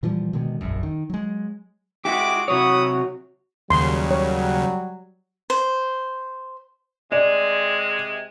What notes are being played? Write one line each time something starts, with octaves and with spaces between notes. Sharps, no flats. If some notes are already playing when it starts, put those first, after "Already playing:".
A#2 E3 F3 G3
B2 D3 D#3 G#3
E1 A#1 F#2
D#3
F#3 G#3
G#3 E4 F#4 G4 D6
C3 F#3 E4 F#4 C#5 F#5 D#6
D#2 C#3 F#3 G3 C6
C#5
C5
C3 G#3 D5